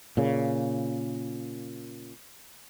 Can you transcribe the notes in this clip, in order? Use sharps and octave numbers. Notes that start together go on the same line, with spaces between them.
A#2 C#3